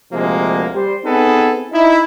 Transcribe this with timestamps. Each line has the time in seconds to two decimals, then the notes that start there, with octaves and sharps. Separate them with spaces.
0.13 D2 C3 F3 G#3 A#3
0.74 G3 C5
1.05 B3 C4 D#4 G#4 A4 B4
1.71 D#4 E4